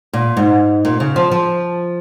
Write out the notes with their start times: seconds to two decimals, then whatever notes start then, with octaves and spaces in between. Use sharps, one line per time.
0.13 A#2
0.37 G#2
0.85 A#2
1.00 C#3
1.16 F3
1.31 F3